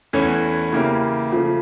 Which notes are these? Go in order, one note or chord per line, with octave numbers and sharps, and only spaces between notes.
E2 E3 A3 C#4
C#3 E3 A#3 E4 G4
C#3 F3 A3